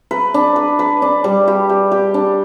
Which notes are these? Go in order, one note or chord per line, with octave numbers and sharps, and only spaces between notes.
B4
D4
B4
B4
D4
G3
G4
G4
G4
D4